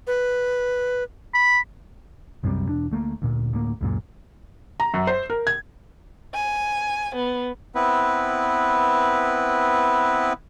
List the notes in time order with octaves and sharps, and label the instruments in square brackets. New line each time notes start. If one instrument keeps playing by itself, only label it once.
[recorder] B4
[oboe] B5
[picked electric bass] C2 F#2 C3 G3
E1 D4
D2 A3 A#3
D2 A#2
D2 A2 A#3
C#2 F#2 A#2
[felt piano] A#5
F#2
C5
A#4
G#6
[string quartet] G#5
B3
[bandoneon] B3 C4 E4 B4